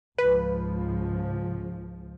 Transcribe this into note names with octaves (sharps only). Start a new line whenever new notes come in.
C#2 G#2 F3 B4